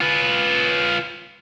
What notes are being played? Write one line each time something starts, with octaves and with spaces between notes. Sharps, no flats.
F4 B4